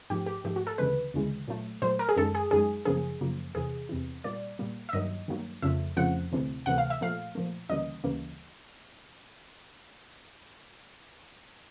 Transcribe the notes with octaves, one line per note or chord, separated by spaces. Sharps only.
G#2 F3 A3 G4
G4
G#2 F3 A3 G4
F#4
A4
D2 C#3 E3 G#3 B4
D2 C#3 E3 G#3
A#2 F#3 A3
A#2 F#3 A3 C5
A#4
G#4
F#2 D#3 G#3 A4
G#4
F#2 D#3 G#3 G#4
F#2 C#3 F3 A#3 G#4
F#2 C#3 F3 A#3
E2 C3 E3 G#4
E2 C3 E3
A#2 G3 A#3 D5
A#2 G3 A#3
E5
G2 D#3 F#3 A#3 D#5
G2 D#3 F#3 A#3
F2 C#3 F3 A3 E5
F2 C#3 F3 A3 F#5
D2 C3 E3 A3
D2 C3 E3 A3 F#5
F5
E5
A#2 F3 A3 F5
A#2 F3 A3
D2 C#3 E3 G3 A#3 D#5
D2 C#3 E3 G3 A#3